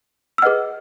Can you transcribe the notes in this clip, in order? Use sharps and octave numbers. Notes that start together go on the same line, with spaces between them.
E6
G#4 B4 D#5 F#5 F6